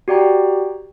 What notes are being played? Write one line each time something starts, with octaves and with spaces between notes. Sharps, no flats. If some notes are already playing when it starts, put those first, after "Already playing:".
F#4 G4 D5 G5 A#5